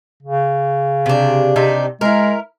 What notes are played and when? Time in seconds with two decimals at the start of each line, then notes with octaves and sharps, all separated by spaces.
0.23 C#3
1.06 C3 D4
1.56 C3 D4 D#4
2.01 G#3 E4 A#4